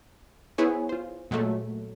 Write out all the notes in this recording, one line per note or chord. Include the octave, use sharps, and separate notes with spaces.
B3 E4 G#4 C5 C#5 G#5
F4 C5
A#2 F#3 G#3 A3